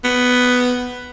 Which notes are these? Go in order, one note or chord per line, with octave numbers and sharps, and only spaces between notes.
B3